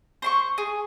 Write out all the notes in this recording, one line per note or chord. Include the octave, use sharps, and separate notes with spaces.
C5 C6 C#6
G#4